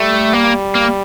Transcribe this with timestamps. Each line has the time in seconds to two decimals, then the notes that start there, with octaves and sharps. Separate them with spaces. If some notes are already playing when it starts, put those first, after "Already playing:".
Already playing: G3 A3
0.33 A#3
0.75 A#3